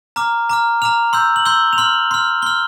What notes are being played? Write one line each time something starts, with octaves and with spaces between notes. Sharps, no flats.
A#5 D6 F6
A#5 D6 F6
A#5 D6 F6 F7
C6 E6 G6
F#7
C6 E6 G6 G7
F7
C6 F6 F#7
C6 F6
C6 F6 G7